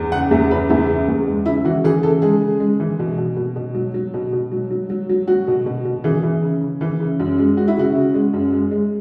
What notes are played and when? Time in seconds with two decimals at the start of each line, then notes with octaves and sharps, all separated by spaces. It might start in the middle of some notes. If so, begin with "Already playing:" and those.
Already playing: E2
0.12 C#3 F#5
0.31 E2 E5
0.51 C#3 B4
0.69 E2 E4
0.88 C#3
1.08 E2
1.27 G#3
1.46 C#3 E4
1.65 E3 F#4
1.84 E3 G#4
2.03 C#3 A4
2.22 G#3 G#4
2.41 C#3
2.60 G#3
2.80 E3
2.99 B2
3.18 B2
3.36 B2
3.56 B2
3.75 F#3
3.94 F#3
4.14 B2
4.33 B2
4.52 F#3
4.70 F#3
4.90 F#3
5.09 F#3
5.28 F#3 F#4
5.48 B2
5.66 B2
5.85 B2
6.04 E3 G#4
6.23 E3
6.42 C#3
6.61 C#3
6.81 E3
7.00 C#3
7.20 F#2
7.38 G#3
7.57 G#3 F#4
7.68 E4
7.77 C#3 F#4
7.95 C#3
8.14 G#3
8.33 F#2
8.52 G#3
8.71 G#3